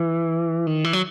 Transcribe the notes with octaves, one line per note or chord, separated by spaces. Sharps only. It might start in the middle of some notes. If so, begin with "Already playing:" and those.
Already playing: E3
D#3
E3
F#3